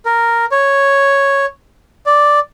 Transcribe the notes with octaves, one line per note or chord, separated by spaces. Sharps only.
A#4
C#5
D5